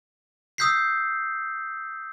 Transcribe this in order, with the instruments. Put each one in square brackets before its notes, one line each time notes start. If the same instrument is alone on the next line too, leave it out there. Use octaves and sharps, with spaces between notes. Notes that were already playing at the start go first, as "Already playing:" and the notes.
[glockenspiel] D#6 E6 G6 B6 C7